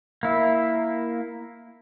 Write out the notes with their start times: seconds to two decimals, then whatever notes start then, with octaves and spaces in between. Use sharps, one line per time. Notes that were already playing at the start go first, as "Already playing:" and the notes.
0.23 A#3 E4